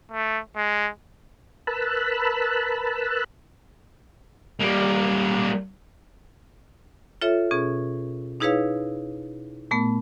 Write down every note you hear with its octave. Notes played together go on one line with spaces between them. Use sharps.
A3
G#3
A#4 B4 A5 B5 E6 F#6
G3 A#3
F4 A4 C#5 E5
B2 C#4 G#4
D#4 E4 G#4 B4 C#5 F5
A#2 A3 B3